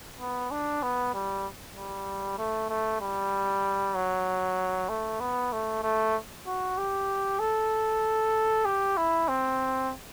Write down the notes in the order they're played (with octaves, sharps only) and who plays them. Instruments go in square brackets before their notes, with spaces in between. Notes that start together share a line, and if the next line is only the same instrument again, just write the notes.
[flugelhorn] B3
D4
B3
G3
G3
A3
A3
G3
F#3
A3
B3
A3
A3
F#4
G4
A4
G4
E4
C4